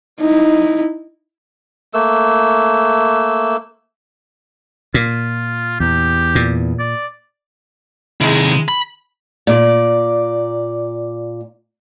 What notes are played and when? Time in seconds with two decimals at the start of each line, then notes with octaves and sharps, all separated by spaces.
0.21 D#4 E4
1.94 A3 A#3 E6
4.94 A#2 F4
5.80 E2 G4
6.35 A#2
6.79 D5
8.21 C3 D#3 G#3 E4
8.68 B5
9.47 A#2 D5